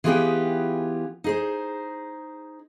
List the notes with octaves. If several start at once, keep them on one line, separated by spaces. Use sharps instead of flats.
E3 B3 F4 G4 G#4 G5
D#4 G#4 C5